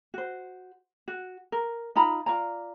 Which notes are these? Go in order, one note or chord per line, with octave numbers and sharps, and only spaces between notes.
F#4 C5
F#4
A#4
D#4 F4 A#5 B5
F4 D5 A#5